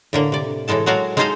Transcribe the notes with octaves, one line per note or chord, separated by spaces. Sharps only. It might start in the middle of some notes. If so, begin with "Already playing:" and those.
A2 D3 A#3
C3 D5
A2 E3 G#3 A4 A5
F#3 G#3 F#4 A#4 F5 A5
G#3 D#4 A4 C5 D#5 F5